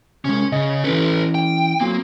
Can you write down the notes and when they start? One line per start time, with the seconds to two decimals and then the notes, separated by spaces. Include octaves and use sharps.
0.25 C3 G#3 C#4
0.52 C#3 D#5
0.84 E3 C#4 A4 B4
1.35 G5
1.81 F#3 A#3 C4